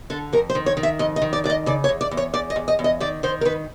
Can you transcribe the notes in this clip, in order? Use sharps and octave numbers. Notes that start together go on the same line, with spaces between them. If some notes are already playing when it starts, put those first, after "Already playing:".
D3 A4
F2 A#4
C5
D#3
C#5
D#3
E5
F2 D#5
D#5
D#3
D5
F2 D5
D#5
C#3 D5
C#5
E2
D5
E2
C#5
E2 D5
D#5
E2
D#5
E2
D#5
D#3 D5
D#3 C5
A#4
D#3 B4